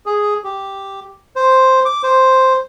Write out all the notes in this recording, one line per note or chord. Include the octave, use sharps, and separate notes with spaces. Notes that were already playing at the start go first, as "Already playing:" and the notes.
G#4
G4
C5
D6
C5